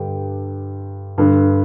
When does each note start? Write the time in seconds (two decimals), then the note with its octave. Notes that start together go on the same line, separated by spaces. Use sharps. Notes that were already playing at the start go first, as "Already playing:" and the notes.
Already playing: G2 D3 G4
1.18 G2 D3